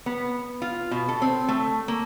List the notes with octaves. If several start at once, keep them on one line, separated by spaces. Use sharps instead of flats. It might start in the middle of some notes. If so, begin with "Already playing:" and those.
B3
F4
B2
A4
C4
A3
A#3